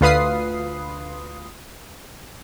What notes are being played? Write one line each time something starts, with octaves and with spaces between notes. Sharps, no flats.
D2 F4 B4 D#6 C7